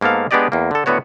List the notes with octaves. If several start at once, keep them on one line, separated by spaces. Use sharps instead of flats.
G#2 A#3 B3 A4 F5
G#3 B3 D4 G4 D5 D#5
E2 A#3
D3 A4
A2 D3 B3 F#4 C#5